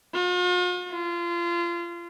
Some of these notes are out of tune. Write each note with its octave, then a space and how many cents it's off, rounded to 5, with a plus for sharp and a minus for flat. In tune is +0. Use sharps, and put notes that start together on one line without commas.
F4 +45
F4 -25